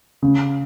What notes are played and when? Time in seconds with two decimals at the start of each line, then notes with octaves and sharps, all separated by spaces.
0.22 C#3